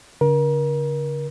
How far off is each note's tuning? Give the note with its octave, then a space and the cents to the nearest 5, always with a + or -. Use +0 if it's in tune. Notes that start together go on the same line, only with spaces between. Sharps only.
D3 -45 A#4 +30